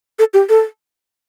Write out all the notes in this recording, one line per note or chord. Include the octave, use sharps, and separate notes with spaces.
A4
G4
A4